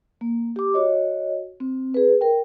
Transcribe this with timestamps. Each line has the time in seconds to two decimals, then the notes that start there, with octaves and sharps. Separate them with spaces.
0.21 A#3
0.56 G4 D6
0.74 F#4 C#5 D#5
1.60 C4
1.94 G#4 B4
2.21 A#4 G5